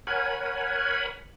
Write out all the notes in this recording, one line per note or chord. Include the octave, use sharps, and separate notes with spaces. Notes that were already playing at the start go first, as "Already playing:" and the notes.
A#4 C#5 F#5 G#5 B5